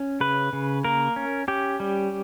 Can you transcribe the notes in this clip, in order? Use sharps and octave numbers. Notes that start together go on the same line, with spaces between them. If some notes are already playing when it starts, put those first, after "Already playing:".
Already playing: C#4
C#3 B4
C#3
A#3 A#4
C#4
C#4 G4
G3